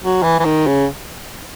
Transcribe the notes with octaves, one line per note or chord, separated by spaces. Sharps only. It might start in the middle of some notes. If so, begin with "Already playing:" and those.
F#3
E3
E3
D#3
C#3